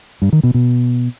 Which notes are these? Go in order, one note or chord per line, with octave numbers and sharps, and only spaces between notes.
G2
D#3
B2
B2